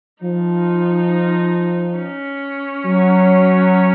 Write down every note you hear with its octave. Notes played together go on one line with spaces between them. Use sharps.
F3 D#4
C#4
F#3